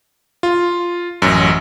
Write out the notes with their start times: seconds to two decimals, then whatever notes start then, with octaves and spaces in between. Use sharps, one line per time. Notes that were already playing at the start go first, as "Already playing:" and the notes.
0.43 F4
1.22 A1 F#2